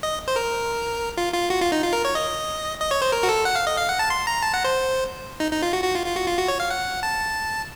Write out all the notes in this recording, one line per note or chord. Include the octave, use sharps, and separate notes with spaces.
D#5
C5
A#4
F4
F4
F#4
F4
D#4
F4
A#4
C#5
D#5
D#5
C#5
C5
A#4
F#4
A4
F#5
F5
D#5
F5
F#5
A5
C6
A#5
A5
F#5
C5
D#4
D#4
F4
F#4
F#4
F4
F4
F#4
F4
F#4
C#5
F5
F#5
A5